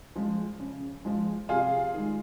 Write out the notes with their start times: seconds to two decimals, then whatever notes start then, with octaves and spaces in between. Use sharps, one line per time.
0.16 F3 G#3
0.60 C#3
1.05 F3 G#3
1.49 C3 F4 G#4
1.94 D#3 G#3